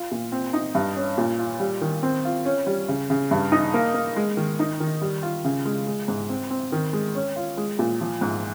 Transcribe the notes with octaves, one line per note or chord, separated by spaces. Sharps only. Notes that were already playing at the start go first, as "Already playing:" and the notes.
Already playing: F4
A#2
C4
D#4
G2
C#4
A#2
F4
G3
D#3
C4
F4
C#4
G3
C#3
C#3
G2
D#4
A#3
A#3
G#3
D#3
D#4
D#3
G3
F4
C#3
G#3
G#3
G#2
C4
C4
D#3
G#3
C#4
F4
G#3
A#2
F3
G#2